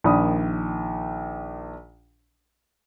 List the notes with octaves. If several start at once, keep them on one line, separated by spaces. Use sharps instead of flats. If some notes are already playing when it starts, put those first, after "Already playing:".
A#1 D#3 D5 B5 D#6